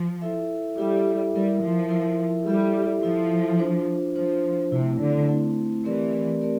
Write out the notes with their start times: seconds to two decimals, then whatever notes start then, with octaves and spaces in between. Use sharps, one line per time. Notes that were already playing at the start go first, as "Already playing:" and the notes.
Already playing: F3
0.22 E4 A4 E5
0.78 G3 E4 A4 E5
1.34 G3 E4 A#4 E5
1.63 F3
1.90 E4 A#4 E5
2.47 G3 E4 A4 E5
3.03 F3 E4 A4 E5
3.59 D4 F4 C5
4.15 F3 D4 F4 C5
4.71 C3 A3 C4 E4
5.01 D3
5.29 A3 C4 E4
5.85 E3 A3 C4 G4 A#4 D5
6.41 A3 C4 G4 A#4 D5